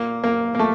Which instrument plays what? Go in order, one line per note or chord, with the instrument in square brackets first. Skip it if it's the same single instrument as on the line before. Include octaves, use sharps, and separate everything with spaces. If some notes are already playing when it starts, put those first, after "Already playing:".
Already playing: [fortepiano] A#2 A#3
A#3
A#3
A3